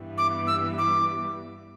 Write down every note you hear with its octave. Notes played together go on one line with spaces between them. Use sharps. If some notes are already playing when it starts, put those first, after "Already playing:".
Already playing: G2 E3 G3 B3
D6
E6
D6